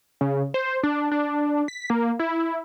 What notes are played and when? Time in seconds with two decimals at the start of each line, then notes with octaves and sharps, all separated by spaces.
0.21 C#3
0.54 C5
0.83 D4
1.12 D4
1.68 B6
1.90 A#3
2.19 E4